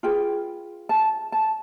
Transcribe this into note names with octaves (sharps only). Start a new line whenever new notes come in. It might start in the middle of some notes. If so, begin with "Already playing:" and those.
F4 G#4 B4 G5
A5
A5